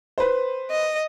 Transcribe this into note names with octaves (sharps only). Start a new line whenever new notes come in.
B4 C5
D#5